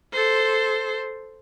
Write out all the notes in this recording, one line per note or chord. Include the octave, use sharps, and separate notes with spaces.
A4 C5